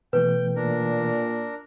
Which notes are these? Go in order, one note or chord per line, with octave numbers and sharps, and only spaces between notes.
B2 E3 A3 B4 G5
A#2 D4 A#4